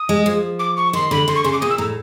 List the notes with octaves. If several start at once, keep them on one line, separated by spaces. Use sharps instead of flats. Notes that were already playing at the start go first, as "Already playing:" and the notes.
Already playing: D#6
G#3
F3
D6
C#6
D#3 C6
D3 B5
D3 C6
C#6
C#3 C6
D6
A#2 D#6
E6
A2 A#5